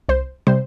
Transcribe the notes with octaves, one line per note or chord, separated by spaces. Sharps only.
C2 C5
C3 G3 C5